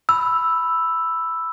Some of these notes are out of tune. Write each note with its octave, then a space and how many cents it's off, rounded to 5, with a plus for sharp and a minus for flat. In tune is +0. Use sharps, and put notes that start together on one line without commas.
B5 +0 E6 +0